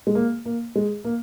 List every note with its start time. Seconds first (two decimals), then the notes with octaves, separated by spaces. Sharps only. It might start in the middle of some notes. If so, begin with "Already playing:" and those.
0.07 G#3
0.15 A#3
0.46 A#3
0.76 G#3
1.04 A#3